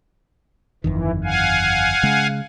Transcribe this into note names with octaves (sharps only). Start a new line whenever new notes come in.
G1 F2 D#3 E3
F5 F#5 G#5
C#3 G#3